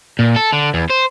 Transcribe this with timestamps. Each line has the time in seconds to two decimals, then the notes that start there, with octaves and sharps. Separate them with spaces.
0.19 A#2
0.36 A4
0.53 D3
0.74 E2
0.90 C5